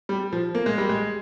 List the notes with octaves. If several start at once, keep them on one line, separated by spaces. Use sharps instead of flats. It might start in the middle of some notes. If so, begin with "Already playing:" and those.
G3
F3
A#3
G#3
G3
G#3